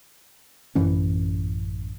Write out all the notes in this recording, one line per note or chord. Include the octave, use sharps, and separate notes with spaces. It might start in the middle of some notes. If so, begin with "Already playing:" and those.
A1 F#2 E3 C#4